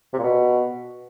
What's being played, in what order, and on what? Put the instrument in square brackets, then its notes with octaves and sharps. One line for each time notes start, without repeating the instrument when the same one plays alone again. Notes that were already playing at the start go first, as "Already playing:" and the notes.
[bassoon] C3
A#2
B2